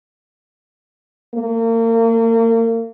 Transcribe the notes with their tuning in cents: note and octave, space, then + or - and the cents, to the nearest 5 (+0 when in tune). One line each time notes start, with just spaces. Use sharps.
A#3 -35